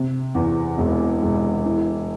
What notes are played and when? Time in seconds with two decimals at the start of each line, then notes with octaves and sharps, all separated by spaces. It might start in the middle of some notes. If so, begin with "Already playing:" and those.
Already playing: C3
0.35 E2
0.78 E1
1.22 E1
1.65 E3